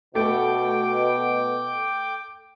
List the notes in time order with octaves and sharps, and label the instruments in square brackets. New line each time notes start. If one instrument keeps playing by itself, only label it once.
[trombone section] B2 [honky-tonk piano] A3 [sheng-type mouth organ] G5 D6